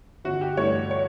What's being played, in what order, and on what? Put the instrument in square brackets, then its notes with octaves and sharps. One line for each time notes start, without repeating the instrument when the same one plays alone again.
[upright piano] G1 F#4
G4
G2 E3 A3 C#5
C#5